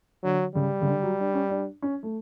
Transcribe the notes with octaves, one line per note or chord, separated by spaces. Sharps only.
D3 F#3
C#3 G3
C#3
D3
F#3
D4
C#4
D4
C#4
A3